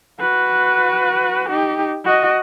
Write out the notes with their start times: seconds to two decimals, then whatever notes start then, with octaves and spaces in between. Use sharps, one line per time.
0.20 F#4 B4
1.49 D#4 G4
2.05 F#4 D#5